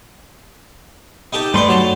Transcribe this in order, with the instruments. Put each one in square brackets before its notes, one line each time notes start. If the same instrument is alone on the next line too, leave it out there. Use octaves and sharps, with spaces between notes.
[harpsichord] D#4 G4 A4
[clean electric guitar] G2 A3 C6 [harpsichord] B4 D5
[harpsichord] F#3 A5